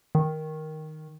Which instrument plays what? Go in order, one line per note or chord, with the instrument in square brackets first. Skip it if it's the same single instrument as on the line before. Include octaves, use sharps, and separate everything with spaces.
[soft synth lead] D#3